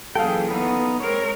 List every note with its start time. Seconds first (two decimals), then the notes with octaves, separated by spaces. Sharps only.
0.15 F#2 A#2 E3 G#4 A4 F5 G5
0.51 B3 D#4
1.00 G#3 C4 A#4 C#5